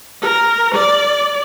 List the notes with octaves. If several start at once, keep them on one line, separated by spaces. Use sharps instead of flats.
A#4
D5